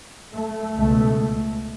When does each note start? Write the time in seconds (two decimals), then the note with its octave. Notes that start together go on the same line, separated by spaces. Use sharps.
0.33 A3
0.78 C#2 B2 A3